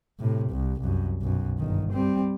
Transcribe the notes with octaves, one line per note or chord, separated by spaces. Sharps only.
A2 C3
C2
C2 F#2
B1 F#2
G1 D#3
G3 C4